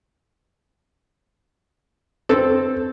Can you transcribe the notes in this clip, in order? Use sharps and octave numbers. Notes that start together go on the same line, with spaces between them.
C4 A4